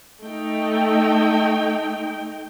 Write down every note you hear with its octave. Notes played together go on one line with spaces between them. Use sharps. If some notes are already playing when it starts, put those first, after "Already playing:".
A3 D#4 G5